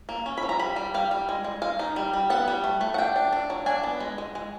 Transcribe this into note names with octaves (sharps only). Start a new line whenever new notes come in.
A#3
C#4
B5
F3
A#5
G3 B5
G3
G3 F5
G3
G#3
G#3
G#3 F5
D#4
G3
G3
B3 F#5
G3
A3
A3
F#5
D4 G5
D4
D4
F#3
D4 G#5
B3
G#3
G#3
G#3